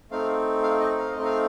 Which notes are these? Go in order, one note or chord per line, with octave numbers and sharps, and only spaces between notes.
A3 C4 D#4 F5
F5
D#5
F5
D#5
A3 C4 D#4
F5